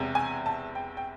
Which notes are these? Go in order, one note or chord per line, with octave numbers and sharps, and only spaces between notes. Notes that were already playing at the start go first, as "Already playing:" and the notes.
Already playing: E1 E2 C3
G#5
A5
G5
G5